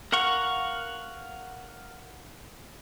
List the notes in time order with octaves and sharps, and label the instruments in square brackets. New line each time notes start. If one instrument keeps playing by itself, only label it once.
[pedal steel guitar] A#4 F5 F#5 C#6